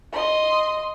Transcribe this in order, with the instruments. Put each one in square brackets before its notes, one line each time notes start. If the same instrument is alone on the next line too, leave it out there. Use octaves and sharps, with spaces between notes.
[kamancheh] D#5 C6